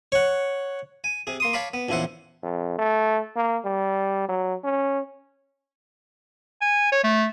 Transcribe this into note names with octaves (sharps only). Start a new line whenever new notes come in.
C#5 F#5
G#5
C3 G#4
A#3 C6 D#6
C#5 F5 A5 B5 D6
B3
A#1 E2 C#3 E4 C5 F#5
F2
A3
A#3
G3
F#3
C#4
G#5
C#5
A3